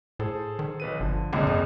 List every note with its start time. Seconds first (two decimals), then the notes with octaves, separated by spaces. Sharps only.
0.19 A2 G#4 A4 C5
0.59 D#3
0.80 B1 B4 D#7
1.00 G1 D3 F3
1.33 C#2 A#2 D3 C4 G#4
1.47 F#2